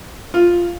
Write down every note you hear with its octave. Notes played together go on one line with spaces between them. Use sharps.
F4